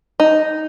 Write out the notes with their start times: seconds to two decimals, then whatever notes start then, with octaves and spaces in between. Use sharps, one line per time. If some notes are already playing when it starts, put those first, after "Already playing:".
0.20 D#4